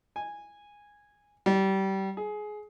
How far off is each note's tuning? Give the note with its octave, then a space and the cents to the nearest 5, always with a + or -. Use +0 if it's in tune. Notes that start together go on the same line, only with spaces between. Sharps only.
G#5 -10
G3 -25
G#4 +20